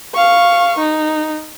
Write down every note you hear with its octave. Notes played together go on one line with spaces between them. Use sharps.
F5 C#6
D#4